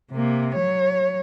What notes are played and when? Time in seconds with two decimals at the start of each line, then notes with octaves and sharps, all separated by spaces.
0.12 C3 A#3
0.55 F#3 C#5